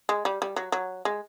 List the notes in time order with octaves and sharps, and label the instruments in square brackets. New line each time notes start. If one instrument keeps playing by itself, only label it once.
[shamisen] G#3
G3
G3
F#3
F#3
G#3